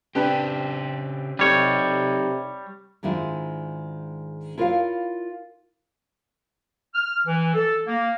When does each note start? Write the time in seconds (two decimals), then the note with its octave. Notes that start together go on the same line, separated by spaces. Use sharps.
0.15 C#3 C4 D4 G4 B4
1.39 C3 G3 D#4 A4 C#5
3.03 G#2 D#3 G#3 D4 E4 F4
4.58 E4 F4 A#4 C5 C#5 F5
6.94 F6
7.27 E3
7.54 A4
7.86 A#3